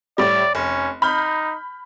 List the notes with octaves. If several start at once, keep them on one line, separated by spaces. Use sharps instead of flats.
A2 G3 D5
F1 C#4
D#4 B5 F6 G6